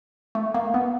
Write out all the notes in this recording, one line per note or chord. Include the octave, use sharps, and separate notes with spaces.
A3
A#3
B3